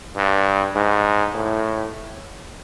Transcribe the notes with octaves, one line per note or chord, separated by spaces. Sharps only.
G2
G#2
A2